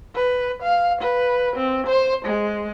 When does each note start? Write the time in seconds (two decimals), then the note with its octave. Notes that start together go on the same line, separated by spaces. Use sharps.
0.15 B4
0.63 F5
1.01 B4
1.56 C4
1.87 C5
2.25 G#3